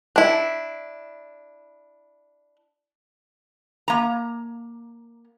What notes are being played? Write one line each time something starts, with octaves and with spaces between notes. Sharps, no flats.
D4 E4
A#3 A#5